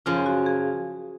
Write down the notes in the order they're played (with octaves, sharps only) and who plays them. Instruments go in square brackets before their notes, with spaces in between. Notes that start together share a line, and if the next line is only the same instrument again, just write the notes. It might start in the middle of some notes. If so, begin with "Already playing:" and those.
[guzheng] F#2 C#3 F3 [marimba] F4
[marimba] F#4
G#4